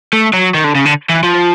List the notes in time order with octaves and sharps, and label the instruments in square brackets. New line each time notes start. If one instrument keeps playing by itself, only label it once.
[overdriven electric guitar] A3
F#3
D#3
D3
C#3
D3
E3
F3